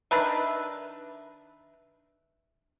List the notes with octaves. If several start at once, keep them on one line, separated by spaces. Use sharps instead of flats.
D#3 D4 B4 E5